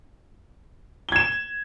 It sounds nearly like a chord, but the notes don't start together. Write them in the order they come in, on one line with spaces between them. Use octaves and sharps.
G7 G#6 E7